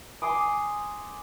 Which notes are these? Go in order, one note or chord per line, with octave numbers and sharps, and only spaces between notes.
G#5 C6 D6 D#6